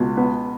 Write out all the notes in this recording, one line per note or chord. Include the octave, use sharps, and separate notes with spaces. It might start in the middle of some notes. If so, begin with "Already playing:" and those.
Already playing: C#2 B2
B3